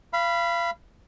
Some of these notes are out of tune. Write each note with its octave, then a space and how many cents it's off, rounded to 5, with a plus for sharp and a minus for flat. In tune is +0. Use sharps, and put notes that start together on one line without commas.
F5 -30 B5 +0